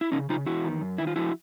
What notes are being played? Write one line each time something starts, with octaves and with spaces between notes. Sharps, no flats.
E4
C#3 C#4 D#4
C#3 D#4 F4
E2 E4 F#4
D#3
F#2
D#3 E4
F4
F3 E4 F#4